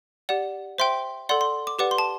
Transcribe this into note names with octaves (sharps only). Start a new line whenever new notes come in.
G4 D5 F#5
C5 E5 G5 C6
A4 D5 F#5 C6
C6
D6
G4 B4 D5 F#5 D6
C6
A5